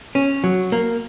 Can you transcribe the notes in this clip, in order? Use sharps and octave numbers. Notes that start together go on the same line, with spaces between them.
C#4
F#3
A#3